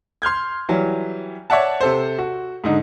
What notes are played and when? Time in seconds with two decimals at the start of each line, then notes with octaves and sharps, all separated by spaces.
0.22 C6 F6 G6 G#6
0.69 E3 F#3 G3
1.50 C#5 D5 E5 F#5 A5
1.81 C3 A4 C5
2.19 F#4
2.64 G#2 D3 D#4